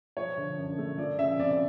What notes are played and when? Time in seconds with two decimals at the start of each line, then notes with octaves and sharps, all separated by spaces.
0.17 F3 C#5
0.37 D3
0.57 F#2
0.78 A3
0.98 F3 D5
1.19 C#3 E5
1.39 F2 D5